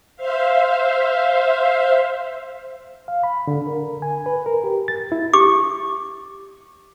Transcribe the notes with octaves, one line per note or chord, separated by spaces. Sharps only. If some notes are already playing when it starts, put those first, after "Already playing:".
C5 E5 F5
F5
B5
D3
A#4
G#5
B4
A#4
G4
A6
E4
G4 D6